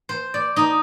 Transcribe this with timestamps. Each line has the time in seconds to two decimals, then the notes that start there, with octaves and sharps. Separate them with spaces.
0.09 C5
0.34 D5
0.56 D#4